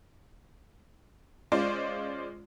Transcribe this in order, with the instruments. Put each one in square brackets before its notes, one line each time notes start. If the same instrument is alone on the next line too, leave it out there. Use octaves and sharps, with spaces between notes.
[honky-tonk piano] G#3 C#4 F4 C5 D5